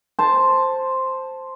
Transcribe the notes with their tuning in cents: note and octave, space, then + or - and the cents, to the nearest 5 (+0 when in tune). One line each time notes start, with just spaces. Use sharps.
C5 +0 A5 +0